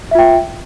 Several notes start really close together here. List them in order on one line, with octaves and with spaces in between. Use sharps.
E5 F4 G5